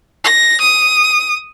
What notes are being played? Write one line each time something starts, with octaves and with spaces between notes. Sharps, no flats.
A#6
D#6